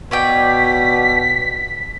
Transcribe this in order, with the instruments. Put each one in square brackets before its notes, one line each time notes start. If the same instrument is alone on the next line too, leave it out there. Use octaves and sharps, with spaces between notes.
[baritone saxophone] B2 [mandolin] C#5 D5 G5 [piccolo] B6